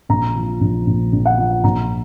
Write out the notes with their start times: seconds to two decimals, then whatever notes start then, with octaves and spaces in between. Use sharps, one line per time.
0.09 A#1 A#5
0.35 F3
0.61 A#1
0.86 A#1
1.12 A#1
1.26 F#5
1.38 F3
1.64 A#1 A#5